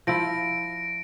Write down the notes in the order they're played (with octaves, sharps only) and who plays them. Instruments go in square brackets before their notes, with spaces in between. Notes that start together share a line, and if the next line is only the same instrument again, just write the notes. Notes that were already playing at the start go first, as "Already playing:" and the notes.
[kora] F3 E4 [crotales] A#6 D7